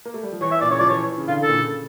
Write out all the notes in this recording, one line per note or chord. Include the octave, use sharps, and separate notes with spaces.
A#3
A3
G3
F3
E3 C#5
E5
A#2 D5
C#3 C#5
F3 D5
E3 C#5
C#3
D3 F4
A4
A#2
C#3